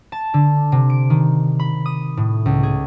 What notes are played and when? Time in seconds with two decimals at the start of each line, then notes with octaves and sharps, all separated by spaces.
0.12 A5
0.34 D3
0.72 C3
0.90 D7
1.10 D#3
1.59 B5
1.86 D#6
2.17 A2
2.46 C#2
2.63 G#4